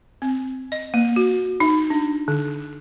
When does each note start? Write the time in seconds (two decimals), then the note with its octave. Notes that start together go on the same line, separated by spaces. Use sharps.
0.22 C4
0.72 D#5
0.94 A#3
1.16 F#4
1.60 D#4
1.90 D4
2.28 D3